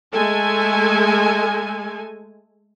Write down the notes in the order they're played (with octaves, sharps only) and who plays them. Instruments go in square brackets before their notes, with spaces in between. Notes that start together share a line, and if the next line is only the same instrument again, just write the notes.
[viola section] G#3 A3 A4 G#5